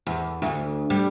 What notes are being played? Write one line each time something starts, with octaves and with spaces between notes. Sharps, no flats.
E2
D2
G3